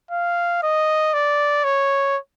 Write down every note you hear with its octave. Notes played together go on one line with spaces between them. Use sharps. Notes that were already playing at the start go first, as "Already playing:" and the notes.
F5
D#5
D5
C#5